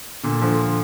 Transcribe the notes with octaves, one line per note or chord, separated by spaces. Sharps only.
A#2 D3
D3 F3